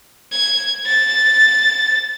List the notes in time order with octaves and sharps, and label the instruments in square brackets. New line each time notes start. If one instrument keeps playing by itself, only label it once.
[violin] G#6
A6